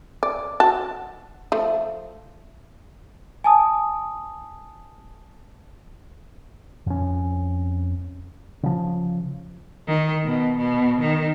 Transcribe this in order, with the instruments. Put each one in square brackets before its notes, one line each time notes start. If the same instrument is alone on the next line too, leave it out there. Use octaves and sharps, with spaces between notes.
[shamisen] D5
F#4 A5
F3 A3
[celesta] G#5 A5 D#6
[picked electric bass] F2 C#4
C#3 F3
[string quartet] D#3
B2
B2
D#3